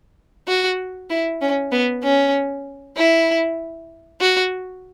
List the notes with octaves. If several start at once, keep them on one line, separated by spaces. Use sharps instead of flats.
F#4
E4
C#4
B3
C#4
E4
F#4